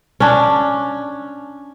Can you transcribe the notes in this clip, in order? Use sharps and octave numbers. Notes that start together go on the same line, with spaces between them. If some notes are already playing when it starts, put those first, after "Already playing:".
C#4 D4